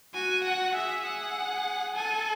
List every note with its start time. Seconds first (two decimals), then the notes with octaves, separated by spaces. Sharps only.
0.14 F#4 G#5
0.44 F#5
0.75 G#4 E5
1.05 F#5
1.96 A4 G#5